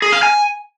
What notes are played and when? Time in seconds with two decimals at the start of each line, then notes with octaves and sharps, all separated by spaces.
0.02 G#4
0.12 F5
0.23 G#5